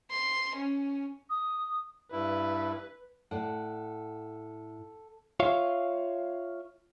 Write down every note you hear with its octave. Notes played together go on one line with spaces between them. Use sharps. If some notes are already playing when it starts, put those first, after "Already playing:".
C6
C#4
D#6
G2 E4 B4
A2 A4 D5 F#5
F4 C#5 E5 F5